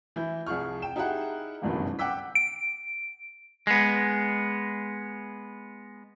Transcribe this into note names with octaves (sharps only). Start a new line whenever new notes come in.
E3 E4 G6
C2 F3 G#4 C#6 F6
G5 E7
D#4 E4 G4 G#4 F#5
F#1 C2 G2 B2 D#3 E3
F#5 G5 D6 E6 B6
D7
G#3 B3